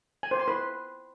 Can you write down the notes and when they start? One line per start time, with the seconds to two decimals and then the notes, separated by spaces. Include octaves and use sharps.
0.23 G#5
0.31 C5
0.40 C6
0.48 B4